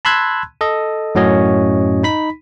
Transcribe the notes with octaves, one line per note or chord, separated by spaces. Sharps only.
A5 B5 C6 E6 F#6 G#6
A4 D#5
F#2 A2 C#4 F#4 C#5 D#5
D#4 B5 B6